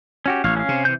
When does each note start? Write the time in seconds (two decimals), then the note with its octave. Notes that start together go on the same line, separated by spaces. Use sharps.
0.26 C#4 F#4 G4
0.44 A1 C#5 F5
0.56 C#4 F5
0.69 C3
0.85 E3 G6